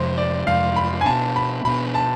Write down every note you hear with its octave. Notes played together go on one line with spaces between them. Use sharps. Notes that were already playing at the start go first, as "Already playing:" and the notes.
Already playing: F2 C3 F3 G#3 C5
D5
F2 C3 F3 G#3 F5
B5
G#5
B2 B3 D4 A5
B5
B2 B3 D4 B5
A5